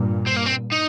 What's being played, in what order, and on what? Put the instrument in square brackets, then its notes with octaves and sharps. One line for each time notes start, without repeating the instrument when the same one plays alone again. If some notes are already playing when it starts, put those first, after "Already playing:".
Already playing: [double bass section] G2 A#2
[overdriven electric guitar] C4
A#3
C4
D#4